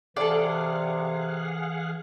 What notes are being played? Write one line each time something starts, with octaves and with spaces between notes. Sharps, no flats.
C3 E3 G#4 A4 D5 F5 F#5